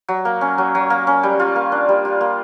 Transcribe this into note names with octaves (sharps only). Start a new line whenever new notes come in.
F#3
A#3
C#4
F#3
F#3
A#3
C#4
G3
F4
A#3
D4
G3
F4
A#3